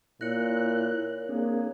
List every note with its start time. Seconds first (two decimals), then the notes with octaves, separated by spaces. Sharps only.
0.21 A#2 E4 A#4 C#5 F#6
1.29 A#3 C4 D4 G#4